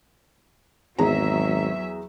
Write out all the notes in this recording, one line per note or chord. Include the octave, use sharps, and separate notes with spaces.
G#1 E2 F#3 G#4 E5 A#5